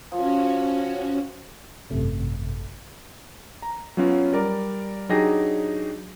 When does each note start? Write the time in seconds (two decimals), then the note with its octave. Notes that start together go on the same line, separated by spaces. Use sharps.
0.12 F3 C#4 F#4
1.90 G#1 F#2 C3 A3
3.62 A#5
3.97 F#3 B3 C#4 F4 F#4
4.33 G3 A#4 D5
5.09 F#3 D4 D#4 G4 G#4 A#6